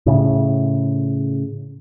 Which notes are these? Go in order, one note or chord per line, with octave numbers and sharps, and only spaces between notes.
A2 C#3